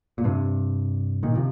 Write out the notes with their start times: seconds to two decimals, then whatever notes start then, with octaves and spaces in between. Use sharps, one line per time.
0.18 A#2
0.24 G2 C3
1.23 A#2 D#3
1.35 C3 F3